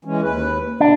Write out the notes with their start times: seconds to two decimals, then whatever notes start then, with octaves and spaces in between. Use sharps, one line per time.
0.05 E3 G#3 C#4
0.21 D#2 B4
0.80 B2 D3 D4